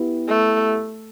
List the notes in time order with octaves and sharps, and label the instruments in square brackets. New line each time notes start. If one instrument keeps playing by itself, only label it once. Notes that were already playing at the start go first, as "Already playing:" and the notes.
Already playing: [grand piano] B3 E4 G4
[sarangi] A3